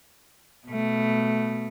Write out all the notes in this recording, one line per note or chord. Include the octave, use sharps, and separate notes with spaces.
B2 A3